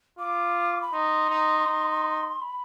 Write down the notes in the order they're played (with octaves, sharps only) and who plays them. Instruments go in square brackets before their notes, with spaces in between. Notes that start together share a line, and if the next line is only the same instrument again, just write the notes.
[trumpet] F4 [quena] D6
[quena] B5
[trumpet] D#4 [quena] C6
[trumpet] D#4
D#4
[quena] B5